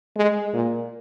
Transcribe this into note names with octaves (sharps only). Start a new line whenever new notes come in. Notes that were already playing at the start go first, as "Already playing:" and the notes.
G#3
A#2